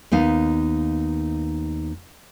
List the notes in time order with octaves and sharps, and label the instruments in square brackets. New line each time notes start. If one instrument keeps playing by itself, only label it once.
[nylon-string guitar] D#2 B3 D#4 F5